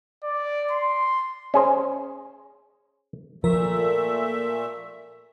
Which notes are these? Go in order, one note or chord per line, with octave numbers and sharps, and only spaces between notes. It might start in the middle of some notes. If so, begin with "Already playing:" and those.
D5
C6
C#4 G#4 C5
A#2 F3 A3 A#4 E5